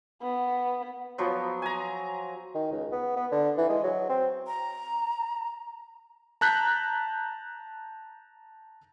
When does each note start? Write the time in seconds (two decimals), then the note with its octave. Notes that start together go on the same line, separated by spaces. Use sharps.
0.22 B3
1.18 F3 F#3 B3
1.62 G#5 A#5
2.55 D#3
2.72 C#2
2.92 B3
3.16 B3
3.32 D3
3.58 E3
3.69 G#3
3.83 F#3
4.09 C4
4.47 A#5
6.41 A5 A#5 F#6 G6 B6